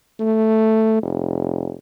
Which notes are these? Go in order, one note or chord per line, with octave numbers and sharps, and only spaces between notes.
A3
F1